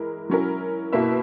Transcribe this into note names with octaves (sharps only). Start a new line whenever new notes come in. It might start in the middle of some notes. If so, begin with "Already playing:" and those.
Already playing: E3 G#3 E4 A#4
F#3 C#4 E4 A#4
B2 A#3 E4 B4 E5